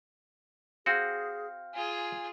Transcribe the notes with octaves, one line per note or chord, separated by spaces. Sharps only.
C4 F#4 G#4 F5 G5 F6
F4 G#4 G#5